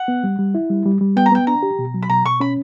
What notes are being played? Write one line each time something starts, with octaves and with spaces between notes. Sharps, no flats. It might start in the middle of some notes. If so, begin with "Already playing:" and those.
Already playing: F#5
B3
G3
G3
E4
G3
G3
G3
B3 G5
A#5
B3 G5
D4 A#5
G4
B2
F#3
B5
B2 A#5
B2 C#6
C#4 B5